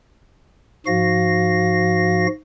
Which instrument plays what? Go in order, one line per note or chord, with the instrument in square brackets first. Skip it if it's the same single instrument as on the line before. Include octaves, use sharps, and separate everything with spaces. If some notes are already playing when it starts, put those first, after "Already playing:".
[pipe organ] G#2 F3 F#4 F5 A#6